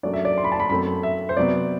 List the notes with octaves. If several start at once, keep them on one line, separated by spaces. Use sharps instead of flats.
F#2 F#3 A3 D4 D5
E5
D5
C6
B5
A5
B5
F#2 F#3 A3 C4 B5
E5
C5
C3 F#3 B3 D5